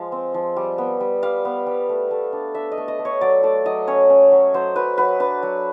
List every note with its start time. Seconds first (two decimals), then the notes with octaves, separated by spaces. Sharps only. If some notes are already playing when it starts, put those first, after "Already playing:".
Already playing: F3 G#3 F5
0.12 C4
0.34 F3
0.56 G3
0.78 B3
1.00 G3
1.23 G3 F5
1.45 B3
1.67 G3
1.89 A3
2.11 A3
2.33 D4
2.54 D4 E5
2.72 D#5
2.78 A3
2.88 D#5
2.99 A3
3.05 C#5
3.21 F#3 D5
3.43 A3 D5
3.66 F#3 D#5
3.88 C#4 C#5
4.10 C#4
4.32 F#3
4.54 F#3 C5
4.76 F#3 B4
4.98 F#3 B4
5.20 D4 B4
5.43 F#3